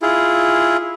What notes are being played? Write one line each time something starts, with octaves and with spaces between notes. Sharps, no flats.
E4 F4 G#4